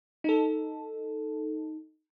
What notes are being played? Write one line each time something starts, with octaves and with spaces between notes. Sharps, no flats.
D#4 A4